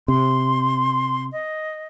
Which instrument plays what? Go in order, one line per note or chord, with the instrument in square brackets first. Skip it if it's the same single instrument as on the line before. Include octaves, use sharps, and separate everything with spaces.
[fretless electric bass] C3 [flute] C6
[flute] D#5